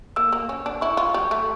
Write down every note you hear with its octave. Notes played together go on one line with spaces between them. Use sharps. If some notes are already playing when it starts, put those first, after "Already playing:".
A#3 E6
A#3
C#4
D4
E4 C#6
F4
G3
A3